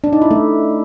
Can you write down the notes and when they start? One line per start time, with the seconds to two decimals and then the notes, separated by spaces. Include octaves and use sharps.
0.04 D4
0.13 D#4
0.22 E4
0.31 A3